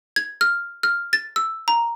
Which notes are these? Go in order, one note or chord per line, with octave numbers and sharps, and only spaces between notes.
G#6
F6
F6
A6
E6
A#5